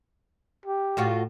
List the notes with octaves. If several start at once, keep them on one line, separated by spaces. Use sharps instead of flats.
G4
A2 F4 F#4